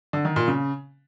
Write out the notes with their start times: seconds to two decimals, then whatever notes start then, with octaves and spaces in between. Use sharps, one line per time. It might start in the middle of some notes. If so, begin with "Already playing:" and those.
0.13 D3
0.25 D#3
0.36 A#2
0.48 C#3